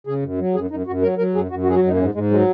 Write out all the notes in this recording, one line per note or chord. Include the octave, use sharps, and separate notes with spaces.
C#3 G#4
F#2
F#3
F#2 G#4
F#2 D#4
F#2 F#4
F#3 A#4
F#3 A#4
F#2 G#4
F#2 F#4
F#4
F#3 G#4
F#4
F#2 D#4
A#3
G#2 C#4
G#2 G#3
F#3 G#3